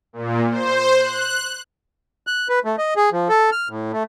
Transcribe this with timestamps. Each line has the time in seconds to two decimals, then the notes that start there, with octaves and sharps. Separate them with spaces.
0.13 A#2
0.50 C5
0.97 F#6
2.27 F#6
2.49 B4
2.65 A3
2.78 D#5
2.96 G#4
3.12 F3
3.29 A4
3.52 F6
3.69 A2
3.92 A3